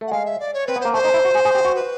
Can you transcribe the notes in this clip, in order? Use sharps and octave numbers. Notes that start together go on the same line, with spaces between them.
A3
F#5
G#3 F5
E5
D5
C#5
C4 B4
B3
C5
A#3
A3 C5
D#4
E4
F#4
G#4
G#4
G4
F#4
B4